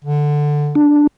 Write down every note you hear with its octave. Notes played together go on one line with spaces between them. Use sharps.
D3
D4